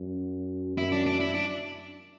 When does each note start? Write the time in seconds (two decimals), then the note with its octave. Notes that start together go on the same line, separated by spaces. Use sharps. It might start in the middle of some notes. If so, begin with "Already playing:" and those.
Already playing: F#2
0.77 F#2 E4
0.92 D4
1.06 D4
1.20 E4
1.35 D4